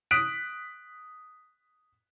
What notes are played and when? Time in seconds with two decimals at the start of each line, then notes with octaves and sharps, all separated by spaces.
0.11 D#6 F#6 B6 D7